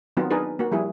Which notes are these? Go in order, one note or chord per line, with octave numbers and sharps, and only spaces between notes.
D#3 F#3 B3 C4 D#4 F4
D4 D#4 G#4 A#4 B4
A#3 F#4
F3 G3 E4 G#4